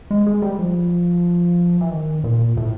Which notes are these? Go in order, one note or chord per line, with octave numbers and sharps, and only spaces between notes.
G#3
G#3
G3
F3
E3
D#3
A#2
A2